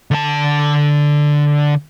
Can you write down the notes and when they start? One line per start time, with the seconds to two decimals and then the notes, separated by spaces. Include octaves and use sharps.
0.11 D3 A5